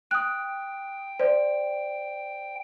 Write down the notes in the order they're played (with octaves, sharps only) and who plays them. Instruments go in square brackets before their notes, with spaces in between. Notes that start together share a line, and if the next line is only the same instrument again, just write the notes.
[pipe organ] G5 [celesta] D#6 F#6
[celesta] C5 D5